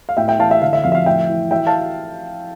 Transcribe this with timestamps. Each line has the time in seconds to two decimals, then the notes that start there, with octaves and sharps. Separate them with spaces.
0.09 F5
0.17 A2 E5 G5
0.28 E5 G5
0.39 E3 F5 A5
0.50 E5 G5
0.62 D3 F5
0.73 E5
0.84 F2 F5
0.92 E5
0.95 F5
1.06 A2 E5 G5
1.29 E3
1.51 E3 E5 G5
1.67 F5 A5